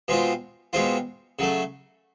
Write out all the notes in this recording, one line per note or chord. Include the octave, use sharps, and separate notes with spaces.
B2 G#3 C4 F4
B2 G#3 C4 F4
C#3 F#3 A3